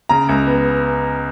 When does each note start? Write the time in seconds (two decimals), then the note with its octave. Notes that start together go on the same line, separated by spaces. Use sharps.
0.09 C#3 A#5
0.29 C#2
0.47 B3